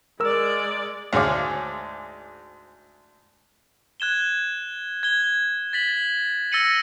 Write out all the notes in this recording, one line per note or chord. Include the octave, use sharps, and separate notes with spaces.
G#3 A#4 D5 E6
D2 G#2 G#4 C#5 F5 D6
F#6 G#6 E7 G7
G#6 G7
A6 B6 F#7
E6 A6 A#6 C#7 D#7 F#7